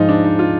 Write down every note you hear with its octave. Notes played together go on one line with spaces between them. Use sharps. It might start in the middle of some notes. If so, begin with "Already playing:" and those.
Already playing: G#2 F3 G#3 D#4 F4
D4
D#4
F4